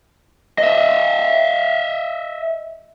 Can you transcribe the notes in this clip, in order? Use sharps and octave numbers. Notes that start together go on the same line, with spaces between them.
D#5 E5